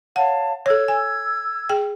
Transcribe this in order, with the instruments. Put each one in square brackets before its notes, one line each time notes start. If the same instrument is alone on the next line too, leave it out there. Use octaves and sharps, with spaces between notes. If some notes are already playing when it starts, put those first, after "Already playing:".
[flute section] C#5 F5 A5 [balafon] F#5
[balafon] A4 C#5 [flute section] E6 G#6
[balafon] G#5
G#4 G5